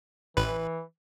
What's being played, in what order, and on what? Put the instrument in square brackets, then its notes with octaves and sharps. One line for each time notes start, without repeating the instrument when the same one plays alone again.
[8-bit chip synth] A1 B4 [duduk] E3